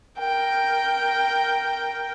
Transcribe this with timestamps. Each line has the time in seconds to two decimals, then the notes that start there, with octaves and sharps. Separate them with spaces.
0.18 A#4 G5